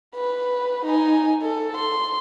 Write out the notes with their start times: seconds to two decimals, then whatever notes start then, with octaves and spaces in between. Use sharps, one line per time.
0.15 B4
0.86 D#4 G#5
1.42 A4
1.76 C6